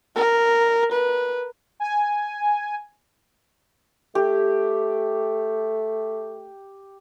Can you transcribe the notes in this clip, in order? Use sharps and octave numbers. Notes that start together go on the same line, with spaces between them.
A#4
B4
G#5
A3 G4